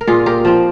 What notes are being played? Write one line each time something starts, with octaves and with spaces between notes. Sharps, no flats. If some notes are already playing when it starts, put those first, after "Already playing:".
A#4
A#2 F4 G#4
G4 A#4
F3 C4